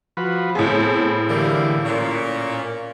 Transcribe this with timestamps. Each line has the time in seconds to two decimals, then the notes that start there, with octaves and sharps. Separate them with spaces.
0.17 F3 F#4 B4
0.55 A2 B3 C4 G#4 A4
1.29 D3 E3 G3 A#3
1.85 A#2 C#4